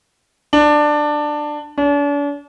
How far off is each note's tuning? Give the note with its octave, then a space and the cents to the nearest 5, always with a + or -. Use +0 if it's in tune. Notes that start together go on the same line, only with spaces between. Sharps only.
D4 +15
D4 -40